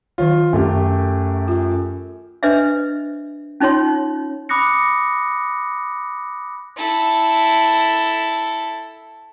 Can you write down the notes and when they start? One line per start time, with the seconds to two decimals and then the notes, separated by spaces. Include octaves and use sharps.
0.18 D#3 F#3 F4 C#5
0.53 F#2 A3 G4
1.48 F4 G#5
2.43 D4 B4 C5 D#5 E5
3.60 C#4 D#4 F4 C#5 C6
4.49 B5 D6 D#6 F#6 A#6 C#7
6.77 E4 A4